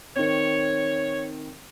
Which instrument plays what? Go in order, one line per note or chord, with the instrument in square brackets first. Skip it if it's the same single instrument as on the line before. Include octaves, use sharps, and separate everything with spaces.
[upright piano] D#3 C4 [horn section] C#5